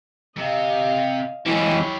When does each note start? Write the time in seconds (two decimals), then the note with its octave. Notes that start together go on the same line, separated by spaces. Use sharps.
0.37 C3 D#5 F5
1.46 E3 F#3 G#3 E4 G4 C#5